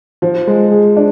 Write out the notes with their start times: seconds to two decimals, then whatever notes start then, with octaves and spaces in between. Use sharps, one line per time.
0.22 F3
0.47 G#3
0.72 G#4
0.97 D4